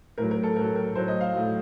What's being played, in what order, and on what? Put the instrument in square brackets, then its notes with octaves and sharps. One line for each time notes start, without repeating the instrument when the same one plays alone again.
[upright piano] A2 F#3 A#4
A#4
A4
A2 F#3 A#4
A#4
A2 F#3 C5
D#5
F5
A2 F#3